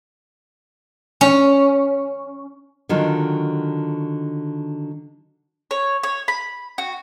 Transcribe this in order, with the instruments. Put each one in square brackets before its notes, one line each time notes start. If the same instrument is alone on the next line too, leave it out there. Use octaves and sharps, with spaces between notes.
[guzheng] C#4
[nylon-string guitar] D3 D#3 F#3 F4
[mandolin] C#5
C#5
B5
F#4